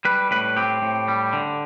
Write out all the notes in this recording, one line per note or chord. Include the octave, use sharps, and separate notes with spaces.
G3 B4
A2 B4
C4 G4
A2
G3
D3